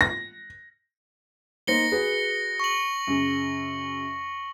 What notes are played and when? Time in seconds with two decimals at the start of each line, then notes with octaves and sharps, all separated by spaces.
0.01 A#6
1.67 A#3 D#4 C5 A#6 C#7 G7
1.92 F#4 G#4 B4
2.60 C#6 F#7
3.07 F#2 C#3